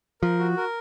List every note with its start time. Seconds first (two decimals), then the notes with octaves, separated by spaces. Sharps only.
0.22 F3 A#4
0.39 F#4
0.57 A#4